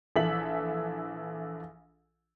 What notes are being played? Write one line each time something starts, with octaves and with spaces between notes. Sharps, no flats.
A#1 E3 A4 E5 B6 F#7